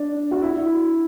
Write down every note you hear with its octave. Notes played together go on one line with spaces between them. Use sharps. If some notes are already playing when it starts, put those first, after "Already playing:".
Already playing: D4
F#4
E4